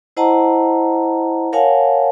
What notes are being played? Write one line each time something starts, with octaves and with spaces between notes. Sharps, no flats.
E4 C5 D#5 F#5 A5 A#5
A#4 C#5 F5 F#5 G#5 A5